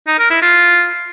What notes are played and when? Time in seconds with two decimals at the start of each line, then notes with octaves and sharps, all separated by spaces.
0.07 D#4
0.19 A#4
0.30 E4
0.42 F4